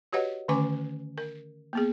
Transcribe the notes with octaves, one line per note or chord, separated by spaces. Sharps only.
F#4 G4 B4 C#5 D#5 F#5
D3 D#3 A3 C#4 G#5 D6
A#4
A#3 B3 G#4